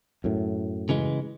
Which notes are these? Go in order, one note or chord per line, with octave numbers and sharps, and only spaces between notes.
F#2 A2
C#3 E3 G#3